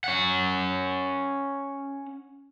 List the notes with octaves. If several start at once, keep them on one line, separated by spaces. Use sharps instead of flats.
C#4 F#5